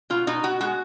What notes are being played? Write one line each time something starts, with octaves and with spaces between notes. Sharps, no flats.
B2 F4
B2 D#4
B2 F#4
G#3 F#4